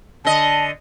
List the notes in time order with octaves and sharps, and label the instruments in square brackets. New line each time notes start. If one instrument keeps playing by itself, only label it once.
[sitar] D3 D#5 [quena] A5